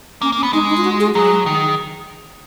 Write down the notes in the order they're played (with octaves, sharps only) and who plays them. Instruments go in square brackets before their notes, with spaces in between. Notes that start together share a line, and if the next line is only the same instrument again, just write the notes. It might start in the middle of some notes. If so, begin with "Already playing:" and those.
[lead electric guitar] A#3 [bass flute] C#4
[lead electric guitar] A#3
[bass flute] C#4
[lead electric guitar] B3
[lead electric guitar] G#3 [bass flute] D#4
[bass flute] D#4
F4
F#4
G#4
[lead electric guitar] F#3 [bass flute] G#4
[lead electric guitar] D#3